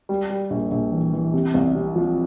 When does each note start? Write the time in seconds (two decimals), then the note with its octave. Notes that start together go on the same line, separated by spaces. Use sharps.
0.09 G3
0.30 G3
0.50 A#1
0.71 A#1
0.92 E3
1.13 E3
1.34 C3
1.54 C2
1.75 C3
1.96 F3